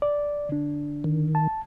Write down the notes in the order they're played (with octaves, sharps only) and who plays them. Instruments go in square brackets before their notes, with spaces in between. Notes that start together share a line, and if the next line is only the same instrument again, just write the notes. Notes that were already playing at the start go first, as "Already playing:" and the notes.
[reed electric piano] D5
D3 D4
[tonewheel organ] D#3
[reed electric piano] A5